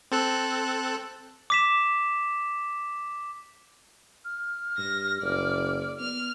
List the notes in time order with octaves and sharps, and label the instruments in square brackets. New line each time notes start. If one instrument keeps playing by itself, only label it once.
[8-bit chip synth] C4 A4 F#6
[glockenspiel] D6 B6 E7
[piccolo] F6
[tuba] G2 [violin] A#6
[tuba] F#1 [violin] D5
[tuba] B3 [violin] F6